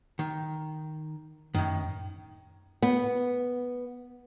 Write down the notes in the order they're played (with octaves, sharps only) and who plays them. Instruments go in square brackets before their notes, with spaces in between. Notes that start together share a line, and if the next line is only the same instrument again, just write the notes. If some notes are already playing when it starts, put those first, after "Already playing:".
[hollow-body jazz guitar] D#3
[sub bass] F#2 [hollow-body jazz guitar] A2 D#3
[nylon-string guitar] B3